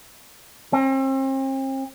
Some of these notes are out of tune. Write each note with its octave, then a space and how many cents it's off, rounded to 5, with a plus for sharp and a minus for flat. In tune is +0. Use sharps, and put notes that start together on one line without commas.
C4 +40